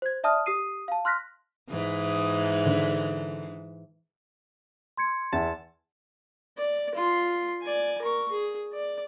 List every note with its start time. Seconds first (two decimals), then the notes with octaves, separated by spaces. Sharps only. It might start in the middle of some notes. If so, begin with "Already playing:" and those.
0.02 C5 G#6
0.24 D5 E5 A5 D#6 F6
0.46 G4 D#6 C7 D#7
0.88 F5 A5
1.05 C6 F6 F#6 A#6 B6
1.69 G#2 E3
2.66 D3
4.97 C6 G#6 C#7
5.33 E2 E5 A5
6.58 D5
6.95 F4 C6
7.62 D5 G#5
8.01 A#4 C#6
8.31 G#4
8.73 D5